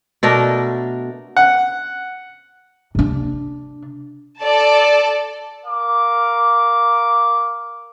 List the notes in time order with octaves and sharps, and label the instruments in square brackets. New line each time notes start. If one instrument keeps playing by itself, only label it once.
[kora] B2 A3 D4 A#4
[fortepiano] F#5
[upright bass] C3 D4
[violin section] A4 D5 A5
[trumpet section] A#4 F5 D6